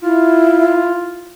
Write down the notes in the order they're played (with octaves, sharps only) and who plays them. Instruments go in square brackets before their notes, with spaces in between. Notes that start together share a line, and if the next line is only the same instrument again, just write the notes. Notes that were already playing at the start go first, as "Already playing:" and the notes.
[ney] E4 [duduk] F4